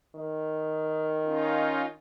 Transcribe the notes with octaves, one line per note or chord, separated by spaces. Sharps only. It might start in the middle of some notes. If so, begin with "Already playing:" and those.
D#3
C#4 D#4 F4